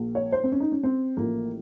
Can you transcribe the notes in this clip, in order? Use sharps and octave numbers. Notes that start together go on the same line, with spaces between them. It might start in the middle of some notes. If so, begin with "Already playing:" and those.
Already playing: A#1 A#2 F3 A#3
C#5
C5
C4
C#4
D#4
C#4
C4
A1 A2 F3 A3 A#3